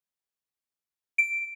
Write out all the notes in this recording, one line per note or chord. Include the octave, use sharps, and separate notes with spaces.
D7